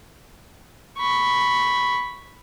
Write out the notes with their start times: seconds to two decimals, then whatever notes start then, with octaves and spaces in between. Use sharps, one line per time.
0.99 B5 C#6